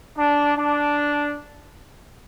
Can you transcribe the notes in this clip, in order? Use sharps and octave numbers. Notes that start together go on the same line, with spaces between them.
D4
D4